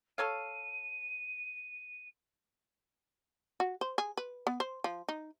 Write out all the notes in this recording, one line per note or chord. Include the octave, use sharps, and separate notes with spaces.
A4 C#5 F5 D#7
F#4
C5
G#4
B4
B3
C5
F3
D#4